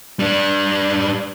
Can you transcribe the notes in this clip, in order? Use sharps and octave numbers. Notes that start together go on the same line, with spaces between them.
G3 D4